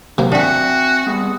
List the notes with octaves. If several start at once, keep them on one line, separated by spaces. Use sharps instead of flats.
A2 C3 F#3 A#3
C4 D4 F#4 E5 F#5 G#5
G3 G#3 B3